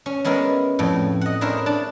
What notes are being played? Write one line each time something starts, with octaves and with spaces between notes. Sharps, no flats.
C#4
G#3 B3 C#4 E4 A#4
F2 A2
D#5 F#5
D4 E4 G#4 A#4 C5 C#5
D4 A5